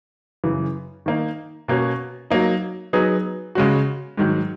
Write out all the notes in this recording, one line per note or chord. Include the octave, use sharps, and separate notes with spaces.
F#2 C#3 E3
D#3 A#3 D#4
B2 A#3 C#4 F#4
F#3 A#3 D#4
F#3 B3 D#4 G#4
C#3 G#3 C#4 F#4
G#2 D#3 F#3